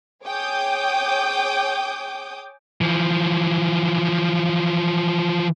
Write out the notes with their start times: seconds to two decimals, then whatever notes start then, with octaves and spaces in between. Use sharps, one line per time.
0.24 G#4 C#5 G5 D6 D#6 G6
2.81 E3 F3